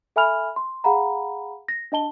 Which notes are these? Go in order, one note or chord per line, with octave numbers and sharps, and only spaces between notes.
A4 E5 G#5 B5 F6 F7
C6
G#4 F5 F#5 A#5 B5
A#6
D4 D#5 A5 G7